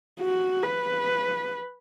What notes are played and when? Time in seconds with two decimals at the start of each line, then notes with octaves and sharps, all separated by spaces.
0.21 F#4
0.63 B4